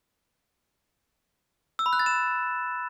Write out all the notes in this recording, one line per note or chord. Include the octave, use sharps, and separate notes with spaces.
E6
B5
F#6
A6
E7